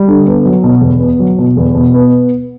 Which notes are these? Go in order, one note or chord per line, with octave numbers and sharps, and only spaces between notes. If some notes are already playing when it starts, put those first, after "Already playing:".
Already playing: G3
D3
B3
F#3
B2
E2
B3
F#3
B2
E2
B2
B3